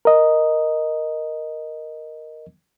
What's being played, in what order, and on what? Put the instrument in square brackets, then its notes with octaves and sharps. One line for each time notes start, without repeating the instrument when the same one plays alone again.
[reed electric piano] A#4 D#5